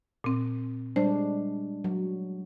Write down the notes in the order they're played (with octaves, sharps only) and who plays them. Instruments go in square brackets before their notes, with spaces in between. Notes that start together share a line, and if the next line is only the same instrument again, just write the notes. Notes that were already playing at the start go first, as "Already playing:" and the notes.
[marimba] A#2 C4
[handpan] G3 G#3 D4 [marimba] C5
[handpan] F#3